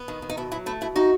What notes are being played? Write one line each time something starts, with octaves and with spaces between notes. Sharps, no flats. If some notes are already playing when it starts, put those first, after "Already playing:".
Already playing: B3
D#3
D#3
D#4
B2 E4
F#3 E4
A3 E4
B2 E4
D#3 D#4 F#4